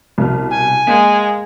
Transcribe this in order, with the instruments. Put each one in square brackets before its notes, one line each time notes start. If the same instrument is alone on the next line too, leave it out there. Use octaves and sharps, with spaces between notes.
[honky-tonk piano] C2 B2 F6
[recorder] G#5
[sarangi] G#3 [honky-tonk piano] A#3